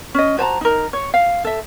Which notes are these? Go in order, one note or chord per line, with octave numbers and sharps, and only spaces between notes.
C#4 D#5
F#4 C5 A5 A#5
D#4 A#4
C#5
F5
A4 E5